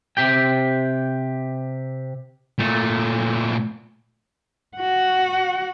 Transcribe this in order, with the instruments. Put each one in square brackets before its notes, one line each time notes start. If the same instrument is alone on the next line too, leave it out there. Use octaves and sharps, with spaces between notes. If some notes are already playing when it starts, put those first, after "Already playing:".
[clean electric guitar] C3 G4 G5
[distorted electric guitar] A#2 A3
[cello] F#4 F#5